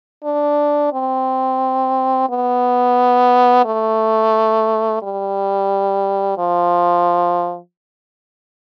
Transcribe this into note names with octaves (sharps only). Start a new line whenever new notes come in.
D4
C4
B3
A3
G3
F3